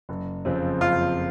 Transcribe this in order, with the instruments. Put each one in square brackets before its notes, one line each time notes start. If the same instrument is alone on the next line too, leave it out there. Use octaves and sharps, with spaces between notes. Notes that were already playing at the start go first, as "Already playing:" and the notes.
[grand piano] F#1
F2 C#3 F3 C4
[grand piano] F#1 [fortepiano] F4